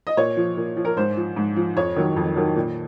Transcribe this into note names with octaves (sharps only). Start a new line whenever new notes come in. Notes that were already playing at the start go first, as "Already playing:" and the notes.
D#5
A#2 C#5
F3
A#2
F3
A#4
G#2 C5
F3
G#2
F3
F2 C#5
D#3 F#3
F2
D#3 F#3
A#2